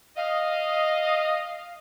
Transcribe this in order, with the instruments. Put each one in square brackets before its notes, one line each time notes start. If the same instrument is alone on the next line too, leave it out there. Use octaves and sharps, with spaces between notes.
[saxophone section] D#5 [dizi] F5